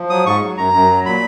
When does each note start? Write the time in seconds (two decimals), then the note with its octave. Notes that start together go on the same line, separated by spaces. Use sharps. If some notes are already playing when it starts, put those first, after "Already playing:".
Already playing: F3
0.10 F#3 D#6
0.26 G#2 C#6
0.41 F#3
0.57 F#2 A#5
0.74 F#2
0.90 F#3
1.05 A#2 B5